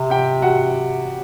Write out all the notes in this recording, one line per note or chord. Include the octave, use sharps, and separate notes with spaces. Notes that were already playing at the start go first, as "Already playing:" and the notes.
Already playing: C3
G4 G5
F#4 F#5